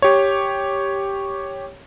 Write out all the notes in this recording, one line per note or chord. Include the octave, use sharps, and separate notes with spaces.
G4 C#5